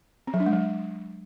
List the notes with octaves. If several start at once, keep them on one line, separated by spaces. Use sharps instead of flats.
C4
F#3
D4
G#3
F#3